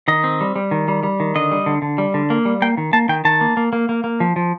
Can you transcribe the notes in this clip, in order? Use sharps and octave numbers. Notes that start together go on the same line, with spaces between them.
D#3 D#5
C4
G3
G3
D#3
G3
G3
D#3
D3 D#5
G3
D3
D3
G3
D3
A#3
G3
A#3 G5
D#3
A#3 A5
D#3 G5
D#3 A5
A#3
A#3
A#3
A#3
A#3
F3
F3